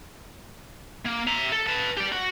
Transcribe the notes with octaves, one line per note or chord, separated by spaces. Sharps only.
A#3
E5 A#5
A4
B4 A5
G4 D5
F#4